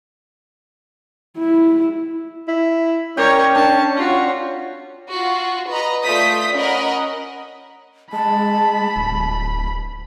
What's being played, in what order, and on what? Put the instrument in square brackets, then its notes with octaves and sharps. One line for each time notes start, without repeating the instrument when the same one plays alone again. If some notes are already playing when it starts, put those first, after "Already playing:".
[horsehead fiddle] E4
[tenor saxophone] E4
[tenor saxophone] C#4 [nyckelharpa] A#4 C#5 [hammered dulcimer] D5 G5
[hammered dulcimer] D4 [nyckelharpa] A5
[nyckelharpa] F4 F#4
[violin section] F4 F#4
B4 D#5 A#5
A3 F4 D5 D#6 G6 B6
C#4 A#4 D#5 F#5 B5
[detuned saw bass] G#3 [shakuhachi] A5 [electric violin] B5
[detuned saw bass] D1